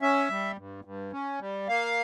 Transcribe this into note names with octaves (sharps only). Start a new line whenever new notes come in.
C#4 E5
G3
G2
G2
C#4
G3
A#3 F5